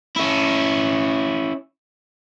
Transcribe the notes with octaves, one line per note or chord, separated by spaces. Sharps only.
C#4 E4